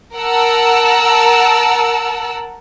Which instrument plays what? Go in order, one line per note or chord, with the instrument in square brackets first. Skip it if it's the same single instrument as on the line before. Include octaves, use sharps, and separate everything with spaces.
[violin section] A#4 F#5 A5 E6